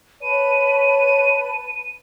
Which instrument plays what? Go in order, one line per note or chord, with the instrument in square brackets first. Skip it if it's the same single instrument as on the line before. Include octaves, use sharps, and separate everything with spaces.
[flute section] B4 A5 B5 [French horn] C#5 [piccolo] D#7